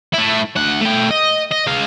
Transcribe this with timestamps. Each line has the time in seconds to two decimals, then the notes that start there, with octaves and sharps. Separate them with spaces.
0.13 A3 E4
0.57 D2 F#5
0.81 A3 G5
1.10 D#5
1.51 D#5
1.67 G#3 F5